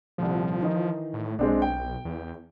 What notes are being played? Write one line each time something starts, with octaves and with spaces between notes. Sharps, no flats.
D#1 C2 F3
D#3 E3 D#4
A2
B1 G#3 C4 D4
G5
E2